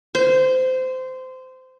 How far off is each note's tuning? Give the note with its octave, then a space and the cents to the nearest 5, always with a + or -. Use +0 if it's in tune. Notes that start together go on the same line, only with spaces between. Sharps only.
C5 -20